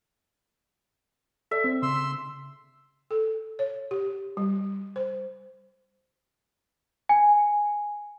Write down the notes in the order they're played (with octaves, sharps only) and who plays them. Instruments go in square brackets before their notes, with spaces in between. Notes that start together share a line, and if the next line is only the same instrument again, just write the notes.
[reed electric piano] A4 D5 [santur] E5
[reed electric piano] C4
[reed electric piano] C#3 [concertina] C6 E6
[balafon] A4
C#5
G4
G3
C5
[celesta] G#5